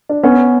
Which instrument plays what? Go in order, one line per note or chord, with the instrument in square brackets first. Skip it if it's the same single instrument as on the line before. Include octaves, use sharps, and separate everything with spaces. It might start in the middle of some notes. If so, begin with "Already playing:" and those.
[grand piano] D4
[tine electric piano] B3 [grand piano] C#4